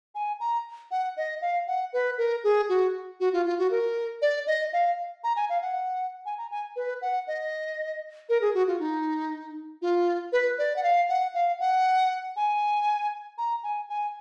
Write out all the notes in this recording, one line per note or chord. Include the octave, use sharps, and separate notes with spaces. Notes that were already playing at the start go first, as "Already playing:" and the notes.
G#5
A#5
F#5
D#5
F5
F#5
B4
A#4
G#4
F#4
F#4
F4
F4
F#4
A#4
D5
D#5
F5
A#5
G#5
F5
F#5
G#5
A#5
G#5
B4
F#5
D#5
A#4
G#4
F#4
F4
D#4
F4
B4
D5
F#5
F5
F#5
F5
F#5
G#5
A#5
G#5
G#5